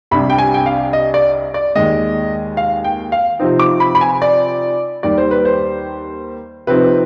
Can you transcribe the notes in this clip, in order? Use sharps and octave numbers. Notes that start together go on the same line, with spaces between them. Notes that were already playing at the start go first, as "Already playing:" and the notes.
C2 C3 G3 D4 B5
G5
G#5
G5
F5
D#5
D5
D5
D#2 D#3 G#3 D#5
F5
G5
F5
C3 F3 C4 D#4
D6
B5
B5
G#5
D5
D#2 D#3 G3 D5
C5
B4
C5
C3 F3 C4 D#4 B4